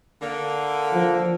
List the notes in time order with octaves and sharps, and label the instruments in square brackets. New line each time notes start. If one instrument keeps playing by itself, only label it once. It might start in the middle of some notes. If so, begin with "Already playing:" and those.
[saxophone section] D3 A#3
[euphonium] F3